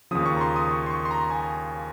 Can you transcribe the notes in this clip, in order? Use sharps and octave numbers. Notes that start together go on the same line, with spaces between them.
D#2 C#3 F3 D#6
C#6
A#5
C6
D#6
C#6
C6
C#6
C6
A#5
G#5